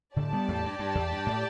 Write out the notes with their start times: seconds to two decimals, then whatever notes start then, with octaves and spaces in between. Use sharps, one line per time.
0.16 A2 D3 G4 D5 A5
0.32 G3 B3
0.48 E2 A2
0.63 G2
0.79 G2
0.95 E2
1.11 G2
1.26 A2